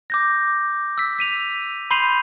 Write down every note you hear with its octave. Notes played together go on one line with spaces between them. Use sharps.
D6 G6 A#6
E6 B6
B6 D#7 F7
B5 C6 G6 C7 D#7 F7